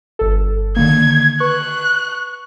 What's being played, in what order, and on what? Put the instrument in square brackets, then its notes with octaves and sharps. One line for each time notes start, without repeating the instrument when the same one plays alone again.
[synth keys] G1 A4
[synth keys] D3 D#3 A#3 [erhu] G#6
[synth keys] B4 C#6 [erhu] F#6